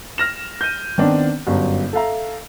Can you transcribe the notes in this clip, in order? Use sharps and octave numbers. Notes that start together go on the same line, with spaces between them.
F6 A#6 E7
G6 D#7
D#3 B3 C4 D4
G1 F#2
A4 E5 F5 A#5